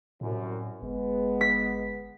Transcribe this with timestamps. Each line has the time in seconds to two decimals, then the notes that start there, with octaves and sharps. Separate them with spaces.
0.21 C2 F#2 A2
0.82 G1 G#3 B3
1.41 B6